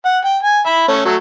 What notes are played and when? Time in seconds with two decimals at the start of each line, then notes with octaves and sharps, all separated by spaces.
0.05 F#5
0.25 G5
0.43 G#5
0.66 E5 B5
0.88 A3 C#4
1.05 F#3 A3